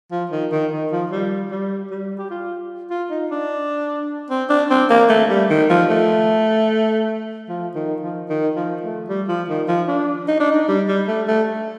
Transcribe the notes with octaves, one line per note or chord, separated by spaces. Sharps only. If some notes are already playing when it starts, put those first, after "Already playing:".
F3
D#3
D#3
D#3
F3
G3
G3
G3
G4
F4
F4
D#4
D4
C4
D4
C4
A#3
A3
G3
D#3
F3
A3
F3
D#3
F3
D#3
F3
A3
G3
F3
D#3
F3
D4
D#4
D4
D#4
G3
G3
A3
A3